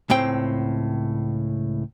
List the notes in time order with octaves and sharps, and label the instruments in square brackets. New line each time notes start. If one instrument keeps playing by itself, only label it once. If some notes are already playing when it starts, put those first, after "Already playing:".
[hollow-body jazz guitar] C#2 A2 C4 G5